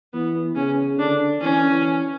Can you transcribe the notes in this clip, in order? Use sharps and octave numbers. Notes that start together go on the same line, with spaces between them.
E3 B3
C#3 C#4
D3 D4
E3 C#4
E3